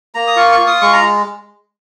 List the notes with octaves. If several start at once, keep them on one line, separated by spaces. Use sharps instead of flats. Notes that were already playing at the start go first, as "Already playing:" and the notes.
A#3 A#5
D#6
F4 C#6
C#6
F4
D#6
G#3 C#6
A#5